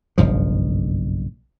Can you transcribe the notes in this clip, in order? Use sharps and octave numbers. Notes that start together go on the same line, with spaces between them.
F#1 B1 G2 F3